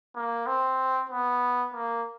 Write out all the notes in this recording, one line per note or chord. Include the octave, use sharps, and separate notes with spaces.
A#3
C4
B3
A#3